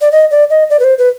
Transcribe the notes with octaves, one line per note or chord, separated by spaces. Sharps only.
D5
D#5
D5
D#5
D5
B4
C5
B4